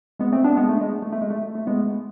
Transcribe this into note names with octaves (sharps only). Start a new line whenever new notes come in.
G#3 B3
A3 C4
B3 D4
G#3 B3
A3
G#3
A3
A3
G#3
A3
A3
A3
G#3 B3